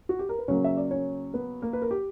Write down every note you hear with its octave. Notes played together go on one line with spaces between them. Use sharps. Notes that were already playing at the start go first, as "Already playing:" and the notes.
F#4
G4
A#4
B4
C#3 F#3 A#3 C#4 C#5
E5
D5
C#4 C#5
B3 B4
A#3 A#4
B4
A#4
G4